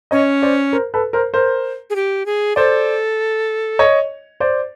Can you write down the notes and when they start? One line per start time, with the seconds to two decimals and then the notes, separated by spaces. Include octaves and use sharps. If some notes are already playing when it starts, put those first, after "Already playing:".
0.11 C#4 C#5 D#5
0.42 C5 D5
0.73 A#4 C5
0.94 A4 B4
1.13 A#4 C5
1.34 A#4 C5
1.90 G#4
1.96 G4
2.26 G#4
2.56 A4 C5 D5
3.79 C#5 D#5
4.40 C5 D5